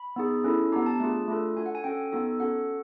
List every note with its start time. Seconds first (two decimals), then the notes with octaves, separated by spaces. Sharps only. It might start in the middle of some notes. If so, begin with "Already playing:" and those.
Already playing: B5
0.16 B3 D#4 G#4
0.44 C#4 E4 A4
0.72 B3 D4 G4 A#5
0.86 A5
1.00 A3 D4 F4 G#4
1.28 A3 D4 F4 A4
1.56 D4 F#4 A4 G#5
1.66 F#5
1.75 G#5
1.84 C#4 F#4 A4 G5
2.12 B3 D#4 F#4 A4
2.40 C#4 F#4 A4 F#5